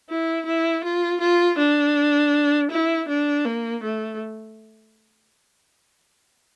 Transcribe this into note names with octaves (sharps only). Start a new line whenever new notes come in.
E4
E4
F4
F4
D4
E4
D4
A#3
A3